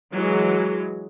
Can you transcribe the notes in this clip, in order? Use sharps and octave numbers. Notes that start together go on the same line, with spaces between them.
E3 F#3 G#3